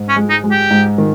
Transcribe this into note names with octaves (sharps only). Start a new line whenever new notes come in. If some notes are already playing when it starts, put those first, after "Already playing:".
Already playing: G#2
C#4
G#3
D#4
G#3
G4
G#2
D#3